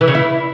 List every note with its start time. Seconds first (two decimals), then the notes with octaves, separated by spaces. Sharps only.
0.01 E3
0.08 C#3
0.15 E4